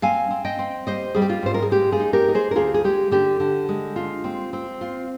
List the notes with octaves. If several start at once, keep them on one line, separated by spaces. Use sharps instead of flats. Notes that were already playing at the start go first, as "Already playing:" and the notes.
C4 F5 G#5
C4
D#5 G5
C4
G3 C5 D#5
G3 G#4
G4
F4
G#2 C5
A#4
G#4
G#3 G4
F4 G#4
D#4
G4 A#4
D#4
G#4 C5
A#4
D2 F4 G#4
G#4
G#3 G4
D3 G4
D3
G#3
F4
C4
C4
F4